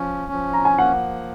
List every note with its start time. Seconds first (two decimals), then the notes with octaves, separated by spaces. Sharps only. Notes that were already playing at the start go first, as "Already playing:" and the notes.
Already playing: F3 C#4
0.32 F3
0.53 A#5
0.65 G#5
0.78 A#3 F#5